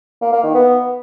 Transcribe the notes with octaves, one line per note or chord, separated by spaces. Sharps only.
A#3
A#3
D#3
B3